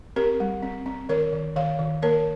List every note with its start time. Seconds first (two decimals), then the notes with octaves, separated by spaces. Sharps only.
0.16 C4 G4 A#4
0.40 G3
0.62 C4
0.86 C4
1.09 D#3 A#4 C#5
1.33 D#3
1.56 D#3 C#5 F5
1.79 D#3
2.02 A#3 A#4 C#5